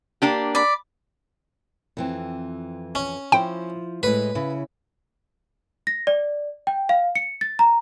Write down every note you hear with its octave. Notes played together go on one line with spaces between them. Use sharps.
A#3 D4 G4
D5 B5
F2 E3 C4
C#4
F3 E4 C5 G5
A2 G#3 B4
C#3 E4
A#6
D5
G5
F5
C#7
A6
A#5